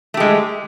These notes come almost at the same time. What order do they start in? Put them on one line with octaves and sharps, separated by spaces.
A3 G4 G#3